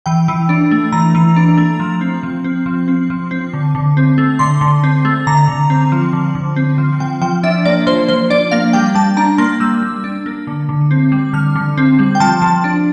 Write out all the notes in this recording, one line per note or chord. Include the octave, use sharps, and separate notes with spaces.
E3 G5
E3
D4
A3
E3 A#5
E3
D4
A3
F3
C4
F3
C4
F3
C4
F3
C4
D3
D3
C4
A3
D3 C6
D3
C4
A3
D3 A#5
D3
C4
F3
D3
D3
C4
F3
F3 G5
F3 G5
D4 E5
A#3 D5
F3 C5
F3 C5
D4 D5
A#3 F5
G3 G5
G3 A5
D4 A#5
A#3 C6
G3 E6
G3
D4
A#3
D3
D3
C4
G3
D3 F6
D3
C4
G3
G5
F3 A5
F3 A5
D4